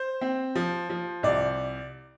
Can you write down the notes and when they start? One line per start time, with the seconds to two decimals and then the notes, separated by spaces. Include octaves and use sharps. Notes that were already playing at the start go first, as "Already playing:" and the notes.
Already playing: C5
0.21 C4
0.55 F3
0.89 F3
1.23 C2 D5